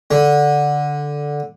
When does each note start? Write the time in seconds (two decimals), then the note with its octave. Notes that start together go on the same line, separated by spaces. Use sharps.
0.11 D3